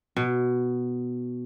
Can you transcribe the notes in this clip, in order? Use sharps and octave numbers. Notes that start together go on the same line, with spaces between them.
B2